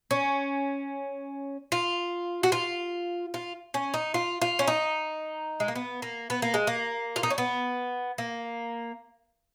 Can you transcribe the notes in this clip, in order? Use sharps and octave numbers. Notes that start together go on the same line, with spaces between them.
C#4
F4
F#4
F4
F4
C#4
D#4
F4
F4
C#4
D#4
G#3
A#3
B3
A#3
B3
A#3
G#3
A#3
F4
D#4
C#4
B3
A#3